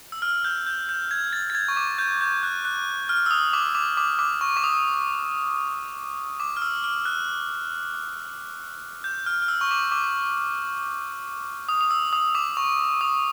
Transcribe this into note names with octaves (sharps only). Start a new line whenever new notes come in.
E6
F6
G6
G6
G6
G#6
A6
A6
G#6
C#6
D6
G6
G6
F#6
F#6
F6
E6
D#6
D6
D6
D6
D6
C#6
D6
D#6
D6
F6
E6
F6
F#6
G6
F6
F6
E6
C#6
D6
D6
D#6
D#6
E6
D#6
D6
C#6
D#6